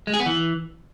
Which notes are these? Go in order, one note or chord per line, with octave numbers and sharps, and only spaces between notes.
G#3
G#4
B3
E3